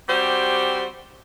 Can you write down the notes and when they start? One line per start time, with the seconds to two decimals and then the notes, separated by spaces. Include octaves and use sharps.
0.09 G3 C4 F#4 G4 C5